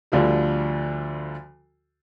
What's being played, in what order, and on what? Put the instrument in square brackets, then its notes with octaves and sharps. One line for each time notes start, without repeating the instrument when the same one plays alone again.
[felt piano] D2 D3 F3 G3